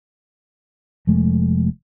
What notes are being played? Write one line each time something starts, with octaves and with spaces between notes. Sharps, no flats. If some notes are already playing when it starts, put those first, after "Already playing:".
F1 F2 G#3 A3